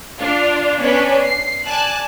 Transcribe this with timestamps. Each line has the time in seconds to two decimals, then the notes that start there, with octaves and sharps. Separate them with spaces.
0.19 D4 F4
0.78 B3 C#4 D4 B4
1.24 C7
1.66 D5 G#5 A5 F#6